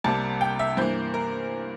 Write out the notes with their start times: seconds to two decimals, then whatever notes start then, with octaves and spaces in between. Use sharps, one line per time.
0.04 C2 C3 G3 A#3 A5
0.41 G5
0.59 E5
0.77 G2 E3 A#3 C5
1.14 A#4